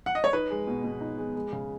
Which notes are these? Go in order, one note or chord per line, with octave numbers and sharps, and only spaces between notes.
F#5
D#5
C#5
D#4 B4
G#3
B2
B2
D#4
G#3
G#3
C#3